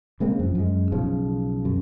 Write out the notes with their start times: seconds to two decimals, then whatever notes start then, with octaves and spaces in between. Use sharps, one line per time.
0.20 C#3 G#3 A#3 C4
0.39 F#2 F3
0.55 F#2 G#3
0.92 B1 C#3 F3
1.65 F#2